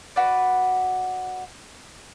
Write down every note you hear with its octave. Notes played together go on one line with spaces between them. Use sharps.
F#4 B4 D5